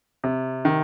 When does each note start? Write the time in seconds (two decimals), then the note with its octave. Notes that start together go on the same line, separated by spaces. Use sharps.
0.24 C3
0.65 D#3